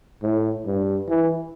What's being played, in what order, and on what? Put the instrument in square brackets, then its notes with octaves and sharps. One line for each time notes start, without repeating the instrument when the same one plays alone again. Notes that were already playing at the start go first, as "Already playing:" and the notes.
[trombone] A2
G2
E3